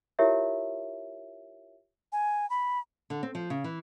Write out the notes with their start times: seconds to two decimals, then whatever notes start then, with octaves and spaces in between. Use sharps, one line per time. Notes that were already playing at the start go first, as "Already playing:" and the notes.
0.19 E4 F4 G4 A#4 C#5 E5
2.12 G#5
2.50 B5
3.10 D3
3.23 C4
3.35 F3
3.50 C#3
3.64 E3